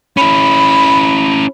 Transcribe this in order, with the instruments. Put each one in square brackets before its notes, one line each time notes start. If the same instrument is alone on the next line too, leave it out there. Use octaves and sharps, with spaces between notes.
[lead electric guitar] C#4 E4 [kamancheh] B5